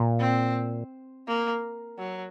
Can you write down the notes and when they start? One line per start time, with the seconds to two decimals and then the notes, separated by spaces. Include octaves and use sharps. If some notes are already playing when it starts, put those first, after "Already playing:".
Already playing: A#2
0.19 C4
1.27 A#3
1.98 F#3